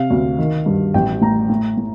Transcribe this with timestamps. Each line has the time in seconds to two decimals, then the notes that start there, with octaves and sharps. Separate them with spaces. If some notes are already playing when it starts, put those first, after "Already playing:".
Already playing: C3 F5
0.10 D2
0.39 D#3
0.66 G2
0.94 A1 G5
1.21 A2 A#5
1.50 A2
1.77 A2